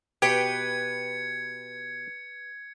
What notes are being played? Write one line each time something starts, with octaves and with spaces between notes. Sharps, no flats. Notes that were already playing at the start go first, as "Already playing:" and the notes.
B2 G4 B4 G5 G#6 C#7